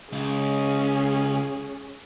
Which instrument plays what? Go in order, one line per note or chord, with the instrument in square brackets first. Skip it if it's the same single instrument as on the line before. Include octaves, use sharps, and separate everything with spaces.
[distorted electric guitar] C#2 [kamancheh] C#4 G#4